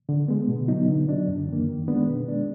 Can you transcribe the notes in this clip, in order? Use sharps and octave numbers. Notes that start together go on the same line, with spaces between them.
D3
G#3 B3
B2
F#3 B3 D#4
D3
F#3 D4
F#2
D#3 A#3
D#3
G#3 B3 D4
B2
G#3 D4